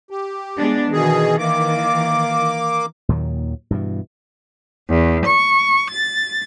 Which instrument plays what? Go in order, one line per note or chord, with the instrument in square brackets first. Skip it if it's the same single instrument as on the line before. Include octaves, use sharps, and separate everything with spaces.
[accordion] G4
[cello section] G#3 B3 D4
[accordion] B2 G#4 [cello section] D#3 E3
[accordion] A#3 D6
[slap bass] D#2 A#2 D#3 F#3
G2 B2 E3
[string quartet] E2
C#6
A6